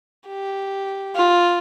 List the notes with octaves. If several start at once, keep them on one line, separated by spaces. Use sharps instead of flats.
G4
F4